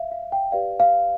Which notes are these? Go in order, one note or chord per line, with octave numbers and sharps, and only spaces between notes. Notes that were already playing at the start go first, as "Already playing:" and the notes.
Already playing: E5 F5
F5
G5
G4 B4 D5 F5
F5